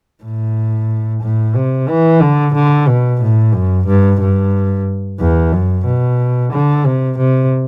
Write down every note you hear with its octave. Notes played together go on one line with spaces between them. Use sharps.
A2
A2
C3
E3
D3
D3
B2
A2
F#2
G2
G2
E2
F#2
B2
D3
C3
C3